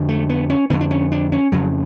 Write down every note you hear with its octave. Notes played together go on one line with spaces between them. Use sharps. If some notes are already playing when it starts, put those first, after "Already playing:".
Already playing: F2 D3
A3
B3
C#4
F2 D3 B3
D4
C#4
D4
C#4
F2 C#3 F#3